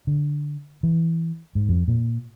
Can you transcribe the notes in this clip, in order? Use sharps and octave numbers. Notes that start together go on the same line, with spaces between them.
D3
E3
G#2
F2
A#2